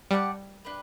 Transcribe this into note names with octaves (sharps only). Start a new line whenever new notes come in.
G3 G4 D5 F#5 A5
D4 G4 B4